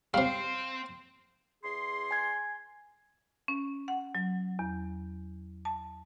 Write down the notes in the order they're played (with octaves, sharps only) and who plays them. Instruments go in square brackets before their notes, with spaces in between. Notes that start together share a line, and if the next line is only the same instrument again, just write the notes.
[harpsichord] C3 G3 [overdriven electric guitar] C4 [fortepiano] F5
[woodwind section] E2 G#4 C6
[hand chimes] G#5 G#6
[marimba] C#4
F#5
F#3
E2
A5